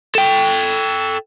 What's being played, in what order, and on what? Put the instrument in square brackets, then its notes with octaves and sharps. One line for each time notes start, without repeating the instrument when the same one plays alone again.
[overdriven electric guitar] A4 G5